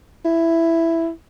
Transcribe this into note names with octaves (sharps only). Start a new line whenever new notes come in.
E4